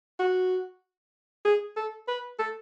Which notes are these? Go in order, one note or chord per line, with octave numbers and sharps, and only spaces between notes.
F#4
G#4
A4
B4
A4